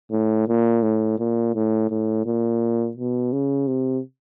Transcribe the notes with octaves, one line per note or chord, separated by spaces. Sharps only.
A2
A#2
A2
A#2
A2
A2
A#2
B2
C#3
C3